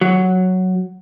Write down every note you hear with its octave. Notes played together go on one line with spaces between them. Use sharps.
F#3